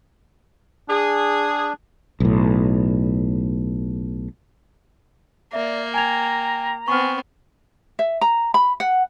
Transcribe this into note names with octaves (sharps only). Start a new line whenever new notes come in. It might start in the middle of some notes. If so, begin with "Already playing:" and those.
D4 G#4
B1 A2
A#3 D5 E5
G5 G#5 A#5 G#6 F7
B3 C4 G#5 C#6 F6
E5
A#5
B5
F#5